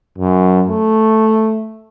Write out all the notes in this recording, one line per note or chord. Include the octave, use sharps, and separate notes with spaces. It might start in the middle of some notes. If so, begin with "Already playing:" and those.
F#2
A3